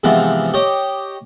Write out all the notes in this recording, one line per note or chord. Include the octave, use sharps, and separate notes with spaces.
G#2 C3 E3 F3 B3
G4 C#5 D#5